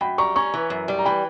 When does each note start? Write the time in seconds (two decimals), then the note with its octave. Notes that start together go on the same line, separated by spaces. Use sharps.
0.01 F#2 G5 B5
0.18 G3 A#5 C#6
0.35 C#4 A#5 C#6
0.54 E3
0.70 F#2
0.88 G3
0.99 A#5
1.05 E3 G5 B5